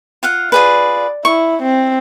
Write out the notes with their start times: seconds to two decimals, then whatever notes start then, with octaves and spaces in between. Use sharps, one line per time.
0.23 F4 F5 F#5
0.52 F4 G#4 B4 D5
1.25 E4 C#6
1.62 C4